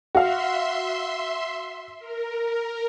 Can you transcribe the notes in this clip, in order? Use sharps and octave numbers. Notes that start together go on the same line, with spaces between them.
F#4 E5 F5 C6
A#4